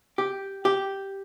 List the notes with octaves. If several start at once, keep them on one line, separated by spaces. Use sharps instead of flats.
G4
G4